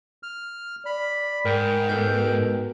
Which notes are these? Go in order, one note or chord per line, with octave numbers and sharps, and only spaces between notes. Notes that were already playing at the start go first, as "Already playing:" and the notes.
F6
D5 B5
G#2 A#4 G5
B2 A4 A#4 G6